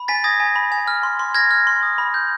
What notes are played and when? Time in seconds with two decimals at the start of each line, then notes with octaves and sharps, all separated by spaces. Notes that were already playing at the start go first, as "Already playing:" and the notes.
Already playing: B5
0.08 G#5 A6 B6
0.24 D#6 G#6 A#6
0.40 G#5
0.56 B5
0.72 G#5
0.88 F6
1.03 C6
1.19 C6
1.35 F6 G#6 A#6
1.51 F6
1.67 C6
1.83 D#6
1.98 B5
2.14 G6